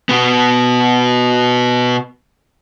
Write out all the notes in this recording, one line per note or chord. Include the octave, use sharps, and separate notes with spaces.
B2 B3